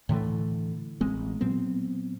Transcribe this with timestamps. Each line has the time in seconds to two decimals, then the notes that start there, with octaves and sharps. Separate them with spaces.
0.09 A2 D3 E3 A3
1.01 A1 G#3 C4
1.41 A#2 F#3 B3 C4